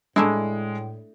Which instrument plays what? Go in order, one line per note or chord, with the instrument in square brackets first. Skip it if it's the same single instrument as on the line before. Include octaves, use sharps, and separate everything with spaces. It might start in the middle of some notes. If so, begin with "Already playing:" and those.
[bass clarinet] A2 [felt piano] G#3 [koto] A3 D4 E4